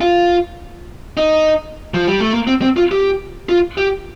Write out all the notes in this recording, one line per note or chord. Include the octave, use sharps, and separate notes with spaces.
F4
D#4
F3
G3
A3
A#3
C4
C4
F4
G4
F4
G4